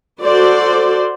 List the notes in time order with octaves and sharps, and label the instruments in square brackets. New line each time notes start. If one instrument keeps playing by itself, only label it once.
[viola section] F#4 A4 C5 D5